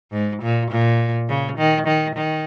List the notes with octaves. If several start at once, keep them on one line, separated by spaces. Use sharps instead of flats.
G#2
A#2
A#2
C#3
D#3
D#3
D#3